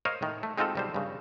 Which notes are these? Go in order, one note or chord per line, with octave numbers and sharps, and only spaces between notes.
A#4 C5 C#5 D#5 F5
A2 D#3
A3
G#3 C4 D#4 F4 F#4 A4
B1 G3 C5
G2 C#3